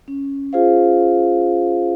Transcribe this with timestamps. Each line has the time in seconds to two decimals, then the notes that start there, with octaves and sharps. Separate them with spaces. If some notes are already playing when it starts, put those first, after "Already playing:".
0.08 C#4
0.53 F4 G#4 C5 F5